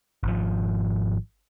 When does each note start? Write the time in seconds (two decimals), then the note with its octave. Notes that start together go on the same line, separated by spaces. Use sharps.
0.23 G#1 F3